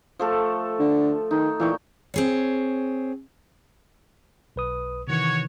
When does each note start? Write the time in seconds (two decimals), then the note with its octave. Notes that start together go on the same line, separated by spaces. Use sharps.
0.19 F3 A3 A4
0.79 D3
1.31 D#3 D#4
1.60 A#2 E3 G5 C#6
2.14 C4 G#4 C#5
4.56 B1 B4 D#6
5.08 C3 D#3 E3 F#4 C#5